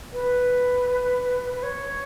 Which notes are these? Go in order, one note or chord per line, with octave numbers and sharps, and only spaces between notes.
B4
B4
C#5